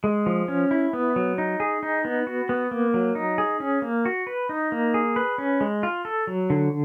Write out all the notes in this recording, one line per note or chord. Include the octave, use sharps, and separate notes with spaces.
G#3
F3
C#4
E4
B3
F#3
D#4
G#4
D#4
B3
F#4
B3
A#3
F#3
D#4
G#4
C#4
A#3
F#4
B4
D#4
A#3
G#4
B4
C#4
G#3
F4
A4
F#3
D3